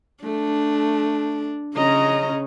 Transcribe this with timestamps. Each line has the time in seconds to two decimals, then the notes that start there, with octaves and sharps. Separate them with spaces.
0.24 A3 D4
1.76 C#3 C#4 D#5 A#5